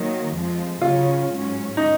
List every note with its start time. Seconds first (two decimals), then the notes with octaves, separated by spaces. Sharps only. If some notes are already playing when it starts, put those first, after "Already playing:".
Already playing: D#3 F#3 A#3
0.34 F2 F3 G#3
0.81 C#3 F#3 C#4 F4
1.30 G#2 F#3 C#4
1.77 D#4